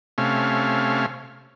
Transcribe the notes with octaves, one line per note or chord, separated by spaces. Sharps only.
C3 A3 C#4 F5